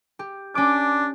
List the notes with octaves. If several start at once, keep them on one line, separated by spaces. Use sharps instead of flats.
G4
C#4 D4 D6